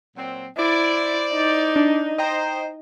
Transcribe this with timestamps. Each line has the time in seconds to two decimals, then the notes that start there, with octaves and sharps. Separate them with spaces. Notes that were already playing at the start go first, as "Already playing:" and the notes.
0.17 A#2 F#3 C4
0.58 E4 C5 D5
1.33 D#4
1.76 D4
2.18 C5 D#5 G5 A#5